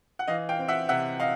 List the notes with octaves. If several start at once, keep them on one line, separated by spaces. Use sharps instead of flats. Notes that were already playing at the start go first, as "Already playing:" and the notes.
F#5
E3 D#5 F5
F5 G5
C4
E5 F#5
C3 E5 F#5
D#5 F5